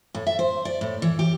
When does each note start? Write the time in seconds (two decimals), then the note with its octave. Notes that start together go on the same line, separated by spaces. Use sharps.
0.15 A2
0.27 E5
0.39 C5
0.65 D5
0.81 A2
1.02 E3
1.19 G4